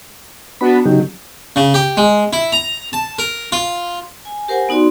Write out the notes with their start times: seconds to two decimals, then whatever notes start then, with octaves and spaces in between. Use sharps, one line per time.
0.61 B3 D4 F#4 B5
0.85 C#3 F#3 D#4 G4
1.56 C#3
1.74 G4
1.97 G#3
2.33 E4
2.52 A#5
2.93 A5
3.19 A#4
3.52 F4
4.25 G#5
4.48 G4 A#4 C5 F#5 G#5
4.69 B3 D#4 F#4 D5 C6